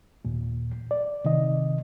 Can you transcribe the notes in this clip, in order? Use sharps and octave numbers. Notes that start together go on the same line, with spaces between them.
D#2 A#2
D5
C3 D#3 D#5